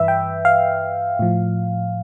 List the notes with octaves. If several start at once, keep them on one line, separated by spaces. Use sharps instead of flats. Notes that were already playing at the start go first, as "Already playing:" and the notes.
Already playing: G2 E3 B4 E5
G5
F5
A2 F3